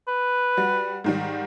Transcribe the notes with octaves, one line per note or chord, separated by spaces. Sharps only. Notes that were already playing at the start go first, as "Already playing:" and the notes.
B4
G3 F#4
G#2 D#3 G3